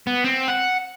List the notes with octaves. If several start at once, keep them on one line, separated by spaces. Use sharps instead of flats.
B3
C4
F#5